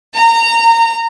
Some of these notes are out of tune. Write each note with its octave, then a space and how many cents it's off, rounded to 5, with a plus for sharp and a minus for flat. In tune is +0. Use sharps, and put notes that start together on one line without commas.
A#5 -20